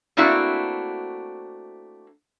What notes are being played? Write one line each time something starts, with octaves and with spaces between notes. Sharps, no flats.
A3 A#3 C4 D4 E4 F#4